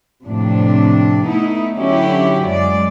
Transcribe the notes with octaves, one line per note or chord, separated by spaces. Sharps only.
F2 A2 C3 D4
A3 B3 D#4 E4
D3 F#3 C#4 E4 F#4 G4
F#2 G#3 D5